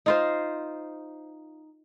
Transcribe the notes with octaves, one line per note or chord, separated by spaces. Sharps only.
D#4 F4 C5